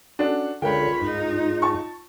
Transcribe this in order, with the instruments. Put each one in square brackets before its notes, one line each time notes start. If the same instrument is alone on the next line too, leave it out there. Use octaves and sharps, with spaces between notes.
[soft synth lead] C#4 [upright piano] D4 F#4 A4
[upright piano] C#2 A#4 G5 [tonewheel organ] D3 [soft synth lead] F4 [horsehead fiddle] C#5 B5
[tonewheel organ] G#2 [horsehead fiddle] D#4
[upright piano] A5 C#6